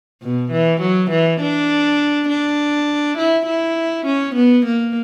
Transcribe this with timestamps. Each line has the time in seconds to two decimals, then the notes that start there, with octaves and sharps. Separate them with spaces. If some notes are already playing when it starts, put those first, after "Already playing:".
0.22 B2
0.52 E3
0.81 F#3
1.10 E3
1.41 D4
2.29 D4
3.18 E4
3.46 E4
4.06 C#4
4.35 B3
4.66 A#3